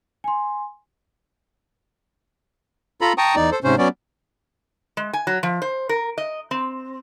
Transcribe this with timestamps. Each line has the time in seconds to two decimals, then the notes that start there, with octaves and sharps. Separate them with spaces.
0.24 G#5 C6
3.01 F4 A4 A#5 B5
3.18 G5 A5 A#5 C#6 D#6
3.36 E2 D#4 D5
3.51 A4 C5
3.64 G#2 C3 C#4 C5
3.78 F#3 B3 C#4 D5
4.97 G#3
5.13 G#5
5.27 F#3
5.43 F3
5.62 C5
5.89 A#4
6.18 D#5
6.51 C4